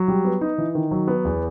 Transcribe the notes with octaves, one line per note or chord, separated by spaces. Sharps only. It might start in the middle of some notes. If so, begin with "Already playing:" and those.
Already playing: F#3
G3
B3
D#4
E3
D#3
F#3
B3
E2